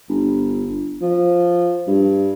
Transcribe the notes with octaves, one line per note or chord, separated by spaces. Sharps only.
G1
F3
G2